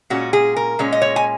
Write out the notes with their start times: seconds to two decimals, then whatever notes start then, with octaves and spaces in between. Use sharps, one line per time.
0.10 A#2 G#3 C#4 F#4
0.33 G#4
0.56 A#4
0.79 A#2 G#3 C#4
0.92 D#5
1.02 C#5
1.16 G#5